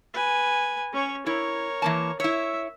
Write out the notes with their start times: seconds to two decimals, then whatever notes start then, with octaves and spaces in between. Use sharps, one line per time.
0.14 B4 G#5
0.93 C#4 C#5
1.26 E4 A#4 C#5
1.82 E3 A#3 A5
2.20 E4 C#5 E5